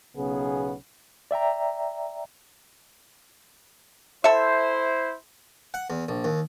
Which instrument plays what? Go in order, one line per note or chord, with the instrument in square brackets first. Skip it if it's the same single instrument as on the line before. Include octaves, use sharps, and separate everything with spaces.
[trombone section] B1 C#3 B3 C#4 G#4
[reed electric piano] D5 E5 G5 A#5
[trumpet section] E4 C5 [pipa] A4 E5
[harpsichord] F#5
E2
A#1
D#2